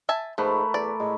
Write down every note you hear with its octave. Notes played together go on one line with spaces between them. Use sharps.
E5 G#5 A5
G#2 F3 A3 A#4 B4
E2 D5
A2 G#3